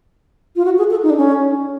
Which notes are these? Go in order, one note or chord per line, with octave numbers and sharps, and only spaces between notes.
F4
F#4
G#4
A4
D#4
D4
C#4